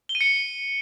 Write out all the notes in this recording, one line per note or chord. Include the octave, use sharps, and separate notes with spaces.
G7
D#7
C#7